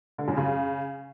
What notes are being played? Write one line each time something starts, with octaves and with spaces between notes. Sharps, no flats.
D3
F#2
C#3